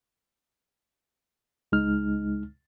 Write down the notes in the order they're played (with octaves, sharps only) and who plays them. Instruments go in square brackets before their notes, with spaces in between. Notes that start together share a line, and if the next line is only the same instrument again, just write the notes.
[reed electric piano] C#2 G#3 D#4 F6